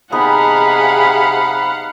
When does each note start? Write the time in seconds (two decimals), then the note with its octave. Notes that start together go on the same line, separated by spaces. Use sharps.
0.12 C3 B3 D#4 G#4 F5 F#5 A5 B5